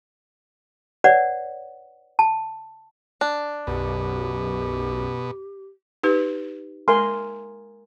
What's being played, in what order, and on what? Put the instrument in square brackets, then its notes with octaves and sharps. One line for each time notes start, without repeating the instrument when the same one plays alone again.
[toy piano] B4 C#5 D5 F#5
A5
[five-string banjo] D4
[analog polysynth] B1 F#2 [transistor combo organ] B2 [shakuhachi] G4
[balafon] D#4 G4 B4
[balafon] G#3 [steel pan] A#4 G#5 C6